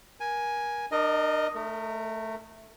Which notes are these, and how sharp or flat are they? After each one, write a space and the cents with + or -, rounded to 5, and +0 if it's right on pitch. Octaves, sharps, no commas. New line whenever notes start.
A#4 +30 G#5 +0
D4 +40 A#4 +0 D#5 +0
A3 +0 A#4 -35